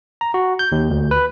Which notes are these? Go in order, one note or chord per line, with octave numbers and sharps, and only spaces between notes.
A#5
F#4
G6
D#2
D2
B4